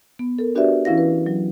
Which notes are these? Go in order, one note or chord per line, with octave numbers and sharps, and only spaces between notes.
B3
A4 A#4
D4 F#4 G4 B4 D5 E5
E3 C#4 E4 F5 A#6
B4
F#3